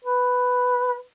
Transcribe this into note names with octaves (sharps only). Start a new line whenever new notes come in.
B4